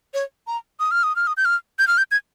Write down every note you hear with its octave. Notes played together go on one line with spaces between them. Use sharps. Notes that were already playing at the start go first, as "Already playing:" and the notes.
C#5
A#5
D#6
F6
D#6
F6
D#6
G6
F6
G6
F6
G6
G#6